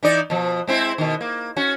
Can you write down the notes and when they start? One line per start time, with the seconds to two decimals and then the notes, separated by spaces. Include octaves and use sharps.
0.03 E3 D#4 D5
0.30 B2 F3
0.67 G#3 C4 E4
0.98 B2 D#3
1.21 A#3
1.56 C#4 F#4